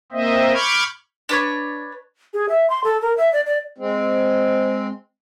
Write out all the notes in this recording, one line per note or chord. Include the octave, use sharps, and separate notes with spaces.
A#3 C4 C5 D#5 E5
B5 C#6 D6 F6 G6 G#6
D4 B4 C#5
G#4
E5
C6
A4
A#4
E5
D5
D5
G#3 C4